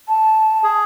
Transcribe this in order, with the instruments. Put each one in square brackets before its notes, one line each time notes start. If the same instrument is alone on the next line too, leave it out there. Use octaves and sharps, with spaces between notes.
[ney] A5
[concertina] G#4